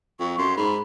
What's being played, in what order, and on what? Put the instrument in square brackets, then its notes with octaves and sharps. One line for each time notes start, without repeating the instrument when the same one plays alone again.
[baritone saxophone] F2 [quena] C#6
[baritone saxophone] F#2 [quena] C6
[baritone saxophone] G#2 [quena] B5